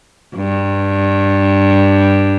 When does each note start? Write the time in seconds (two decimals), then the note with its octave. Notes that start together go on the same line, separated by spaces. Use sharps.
0.36 G2